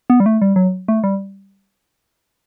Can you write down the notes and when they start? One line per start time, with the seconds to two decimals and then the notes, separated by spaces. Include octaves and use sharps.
0.10 B3
0.20 G3
0.26 A3
0.42 G3
0.56 F#3
0.88 A3
1.04 G3